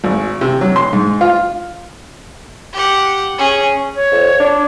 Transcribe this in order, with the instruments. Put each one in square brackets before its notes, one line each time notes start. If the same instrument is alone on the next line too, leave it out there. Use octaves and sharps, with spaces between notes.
[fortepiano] G#1
C3
F#3
C6
G#2
F4
[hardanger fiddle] G4 F#5
C#4 G#4
[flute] C#5
[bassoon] F2
D4